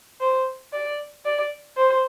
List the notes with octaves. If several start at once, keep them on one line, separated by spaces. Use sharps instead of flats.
C5
D5
D5
C5